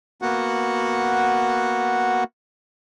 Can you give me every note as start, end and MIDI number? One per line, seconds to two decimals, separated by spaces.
0.22 2.24 58
0.22 2.24 59
0.22 2.24 66
0.22 2.24 78